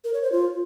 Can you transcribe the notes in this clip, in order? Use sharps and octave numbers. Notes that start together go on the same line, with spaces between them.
A#4
C#5
C5
F4